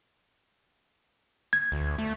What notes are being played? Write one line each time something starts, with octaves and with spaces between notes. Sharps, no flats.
G#6
D2
A3